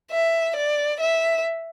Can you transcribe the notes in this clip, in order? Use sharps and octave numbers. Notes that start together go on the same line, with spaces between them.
E5
D5
E5